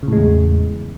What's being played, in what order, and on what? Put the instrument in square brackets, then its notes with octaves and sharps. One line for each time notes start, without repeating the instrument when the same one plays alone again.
[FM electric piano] C#3
A2
G#3
E2